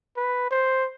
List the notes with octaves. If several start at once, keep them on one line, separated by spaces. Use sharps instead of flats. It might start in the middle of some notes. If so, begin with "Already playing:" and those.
B4
C5